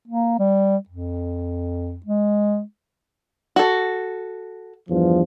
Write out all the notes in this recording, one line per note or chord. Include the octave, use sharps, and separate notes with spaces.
A#3
G3
F2
G#3
F#4 A4
E2 G2 F3